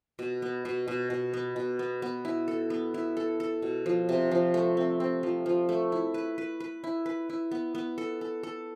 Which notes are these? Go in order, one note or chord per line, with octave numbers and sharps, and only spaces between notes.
B2
B3
B2
B2
B2
B3
B2
B3
B3
E4
A4
B3
E4
A4
A4
B2
F3
C3
F3
A3
C4
C4
F3
F3
A3
E4
B4
B4
B4
E4
B4
E4
B3
B3
A4
A4
A4